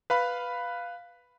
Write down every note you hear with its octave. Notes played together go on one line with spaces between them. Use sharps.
B4 F5 B5